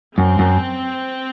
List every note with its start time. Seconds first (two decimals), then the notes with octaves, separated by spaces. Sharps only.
0.17 F#2 C4
0.39 F#2